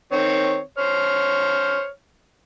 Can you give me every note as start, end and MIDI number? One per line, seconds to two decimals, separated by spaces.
0.12 0.59 51
0.12 0.59 60
0.12 0.59 73
0.78 1.87 72
0.78 1.87 73
0.78 1.87 89